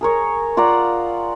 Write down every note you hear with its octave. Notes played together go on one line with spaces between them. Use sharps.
G#4 A#4 C#5
F4 D5 F#5 A#5